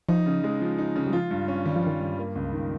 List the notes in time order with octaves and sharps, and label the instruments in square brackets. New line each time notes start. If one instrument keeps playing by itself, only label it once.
[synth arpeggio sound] F3 [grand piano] D#4
[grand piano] C#3
G#3
F3
D#4
C#3
[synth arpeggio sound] G3
[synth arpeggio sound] F3 [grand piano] F4
[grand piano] G2
C#4
[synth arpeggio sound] D#3 [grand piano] G3
[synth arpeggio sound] F3
[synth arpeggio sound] D#3 [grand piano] F4
[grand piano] G2
A#3
C#2
D#3